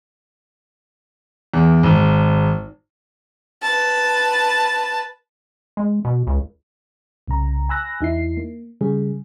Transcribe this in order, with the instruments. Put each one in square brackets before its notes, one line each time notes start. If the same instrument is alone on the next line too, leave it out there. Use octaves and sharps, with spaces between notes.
[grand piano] E2
G#1
[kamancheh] B4 A5
[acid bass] G#3
B2
C#2
[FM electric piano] C2 C#3 A#5
G#5 B5 E6 F#6 A#6
E2 D#4 E4 C7
A#3
C#3 G3 G#4